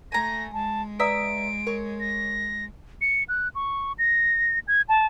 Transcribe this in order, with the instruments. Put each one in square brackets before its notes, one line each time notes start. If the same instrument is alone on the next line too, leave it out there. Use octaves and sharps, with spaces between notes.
[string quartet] A3 [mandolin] G#5 A#5 [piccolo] A#6
[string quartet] G#3 [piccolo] A5
[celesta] B4 D5 A#5 [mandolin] E5 D#6 E6 [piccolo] D7
[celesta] A#4 [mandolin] C#5
[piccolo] A#6
C#7
F#6
C#6
A#6
G#6
A5